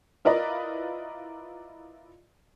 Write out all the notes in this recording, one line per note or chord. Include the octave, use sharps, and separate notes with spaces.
E4 F4 A#4 B4 D5 D#5